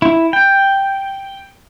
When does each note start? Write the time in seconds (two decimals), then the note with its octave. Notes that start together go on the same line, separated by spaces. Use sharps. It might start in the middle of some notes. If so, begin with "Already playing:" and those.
0.02 E4
0.33 G5